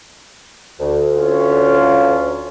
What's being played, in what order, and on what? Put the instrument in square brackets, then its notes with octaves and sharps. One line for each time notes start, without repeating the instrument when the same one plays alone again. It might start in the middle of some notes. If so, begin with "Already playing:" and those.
[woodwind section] D2
[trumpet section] C#4 F4